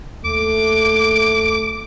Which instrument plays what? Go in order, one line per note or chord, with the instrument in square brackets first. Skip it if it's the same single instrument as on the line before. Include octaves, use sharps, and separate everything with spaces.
[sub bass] D#2 [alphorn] A3 [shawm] D6